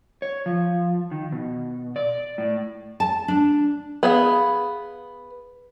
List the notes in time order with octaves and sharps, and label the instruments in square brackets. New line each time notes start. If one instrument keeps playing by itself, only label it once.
[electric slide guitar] C#5
F3
D#3
B2
D5
A2
[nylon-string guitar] A5
D4
[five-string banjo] B3 G#4 F5